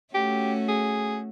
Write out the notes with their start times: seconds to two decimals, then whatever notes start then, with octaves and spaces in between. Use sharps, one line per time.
0.14 A3 C#4 F#4 G4
0.68 G#4